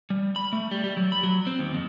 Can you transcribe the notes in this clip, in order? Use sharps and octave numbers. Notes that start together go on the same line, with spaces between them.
G3
B5
A3
G3
G3
F#3
B5
F#3
C4
D#2
F2